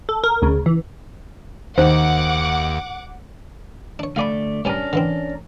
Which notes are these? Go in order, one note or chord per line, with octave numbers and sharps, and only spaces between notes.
A4
A#4
D2 C#3
E3
D#2 D#3 C5 F#5 D6
D4 C#5
D2 A3 D5 F5 G#5 B5
B1 G3 C#4 D4 A#4 G#5
D3 E3 C4